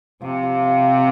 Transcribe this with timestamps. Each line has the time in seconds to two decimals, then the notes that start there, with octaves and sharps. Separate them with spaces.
0.22 C3 F3
0.43 F4
0.64 F4
0.84 F4